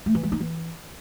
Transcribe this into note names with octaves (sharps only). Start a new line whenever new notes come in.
A3
E3
G#3
D#4
E3